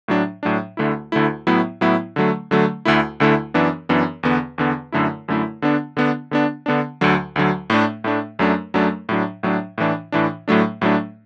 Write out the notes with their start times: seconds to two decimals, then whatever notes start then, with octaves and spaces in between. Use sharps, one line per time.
0.08 A2 F#3 D4
0.43 A2 F#3 D4
0.77 D2 D3 A3 E4
1.12 D2 D3 A3 E4
1.47 A2 F#3 B3 E4
1.81 A2 F#3 B3 E4
2.16 D3 F#3 A3
2.51 D3 F#3 A3
2.85 D2 D3 A3 E4
3.20 D2 D3 A3 E4
3.54 F#2 E3 B3 D4
3.89 F#2 E3 B3 D4
4.23 E2 D3 B3
4.58 E2 D3 B3
4.92 F#2 D3 A3 E4
5.28 F#2 D3 A3 E4
5.62 D3 B3 D4
5.97 D3 B3 D4
6.31 D3 B3 D4
6.66 D3 B3 D4
7.01 D2 D3 F#3
7.36 D2 D3 F#3
7.70 A2 A3 D4
8.04 A2 A3 D4
8.39 F#2 F#3 A3 D4
8.74 F#2 F#3 A3 D4
9.09 A2 F#3 D4
9.43 A2 F#3 D4
9.78 A2 E3 D4
10.12 A2 E3 D4
10.48 A2 F#3 A3 D4
10.81 A2 F#3 A3 D4